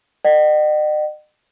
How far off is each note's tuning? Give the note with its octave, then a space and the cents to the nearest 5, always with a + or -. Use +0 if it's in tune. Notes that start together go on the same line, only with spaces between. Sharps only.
D#5 -45 F#5 +45